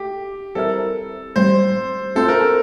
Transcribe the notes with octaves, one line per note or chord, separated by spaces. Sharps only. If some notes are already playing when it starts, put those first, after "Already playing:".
Already playing: A3 G4
G3 C4 E4 A4 A#4
A2 G3 C4 C5
A3 C4 F4 A4 C5
A#4
A4